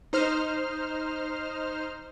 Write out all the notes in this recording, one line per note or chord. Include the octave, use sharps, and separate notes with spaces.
D#4 C5 F6